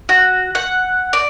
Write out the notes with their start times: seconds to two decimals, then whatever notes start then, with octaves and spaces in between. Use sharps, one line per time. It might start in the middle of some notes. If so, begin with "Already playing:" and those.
0.09 F#4
0.55 F#5
1.13 D5